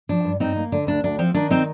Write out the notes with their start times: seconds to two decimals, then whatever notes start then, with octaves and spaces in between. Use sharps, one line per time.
0.09 F3 D4
0.25 G2
0.40 G2 C4 D#4
0.56 A#3
0.72 D3 D4
0.87 D2 D4
1.04 D2 D4
1.18 F3 C4
1.34 D#3 D4
1.50 C4 D#4